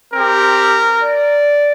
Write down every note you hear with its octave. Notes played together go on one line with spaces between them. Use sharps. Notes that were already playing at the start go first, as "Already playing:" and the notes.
C4 G4 A#4
D5